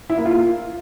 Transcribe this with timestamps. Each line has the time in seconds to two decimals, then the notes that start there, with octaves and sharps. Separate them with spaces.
0.10 E4
0.18 A#3
0.25 F4